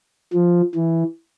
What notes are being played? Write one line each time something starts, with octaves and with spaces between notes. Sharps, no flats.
F3
E3